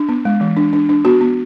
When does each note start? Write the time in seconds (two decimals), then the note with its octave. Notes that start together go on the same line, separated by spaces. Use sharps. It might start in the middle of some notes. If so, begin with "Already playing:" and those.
Already playing: D4
0.09 B3
0.25 G#3
0.41 E3
0.57 D4
0.73 D4
0.89 D4
1.05 B3 F#4
1.21 B3